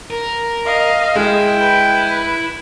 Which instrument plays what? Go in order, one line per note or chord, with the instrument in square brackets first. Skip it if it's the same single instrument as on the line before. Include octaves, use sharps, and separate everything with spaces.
[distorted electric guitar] A#4
[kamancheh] D#5 F5
[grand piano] G#3 [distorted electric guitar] E4 [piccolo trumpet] G5
[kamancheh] B4